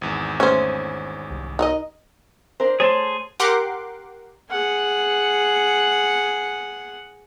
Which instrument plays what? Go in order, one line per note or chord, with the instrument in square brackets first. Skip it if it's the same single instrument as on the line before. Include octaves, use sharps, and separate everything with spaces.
[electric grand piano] G#1 E2
[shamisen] A3 C5 [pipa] C#4
[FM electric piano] C2
[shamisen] D#4 A#4 D#5
[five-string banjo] D4 A#4 C5
[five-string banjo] A3 C5 C#5 [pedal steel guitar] G#4 A5 C6
[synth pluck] G4 A#4 F#5 C6 D6
[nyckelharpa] G#4 F#5